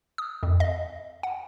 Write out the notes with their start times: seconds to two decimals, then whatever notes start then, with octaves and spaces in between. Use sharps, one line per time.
0.18 D#6
0.43 F2
0.60 D#5
1.23 F#5